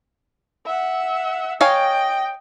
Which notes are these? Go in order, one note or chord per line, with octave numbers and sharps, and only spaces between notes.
E5 F#5
C#5 D#5 F5 G5 G#5